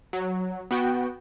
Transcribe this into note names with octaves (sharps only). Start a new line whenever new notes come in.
F#3
B3 F#4 G5